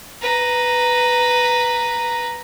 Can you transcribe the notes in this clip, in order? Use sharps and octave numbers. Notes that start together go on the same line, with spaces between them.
B4 A#5